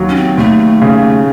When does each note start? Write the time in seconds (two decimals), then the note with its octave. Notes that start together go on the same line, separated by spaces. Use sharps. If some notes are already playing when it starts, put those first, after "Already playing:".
Already playing: D#2 F#3
0.09 C#4
0.15 C4
0.37 D#2 A3
0.82 C#3